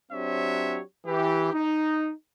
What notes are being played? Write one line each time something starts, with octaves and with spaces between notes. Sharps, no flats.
F#3 C4 D4 G4 C#5 E5
E3 G4
D#4